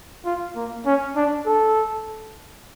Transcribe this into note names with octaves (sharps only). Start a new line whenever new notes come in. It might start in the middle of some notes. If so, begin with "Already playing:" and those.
F4
A#3
C#4
D4
A4